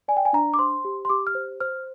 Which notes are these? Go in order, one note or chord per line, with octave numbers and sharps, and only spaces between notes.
D5 G#5
G5
G#5
D4 A#5
D6
C5 C6
G4
C6
G4 D6
F6
C5
C5 F6